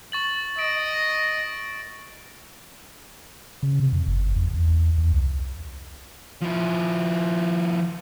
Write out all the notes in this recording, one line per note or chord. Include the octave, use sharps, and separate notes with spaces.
C#6 A6 F#7
D#5 D7
C#3
C3
F2
G1
F2
E2
E2
C2
F3 E4